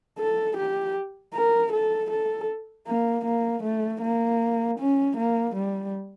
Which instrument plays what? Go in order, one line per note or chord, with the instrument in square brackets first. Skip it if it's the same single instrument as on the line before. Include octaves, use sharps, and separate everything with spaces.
[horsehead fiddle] A4
G4
A#4
A4
A4
A#3
A#3
A3
A#3
C#4
A#3
G3